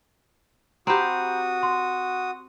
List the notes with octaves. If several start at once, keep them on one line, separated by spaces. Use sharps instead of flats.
C4 F#4 G4 A#5 B5 D#6 G6
C6